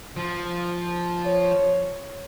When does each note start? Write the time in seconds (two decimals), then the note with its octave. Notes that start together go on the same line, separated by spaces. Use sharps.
0.16 F3
1.26 C#5